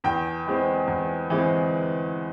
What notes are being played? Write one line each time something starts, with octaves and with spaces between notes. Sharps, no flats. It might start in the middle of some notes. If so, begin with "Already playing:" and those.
E2 G5
E3 G#3 C4
E2
E3 G#3 C4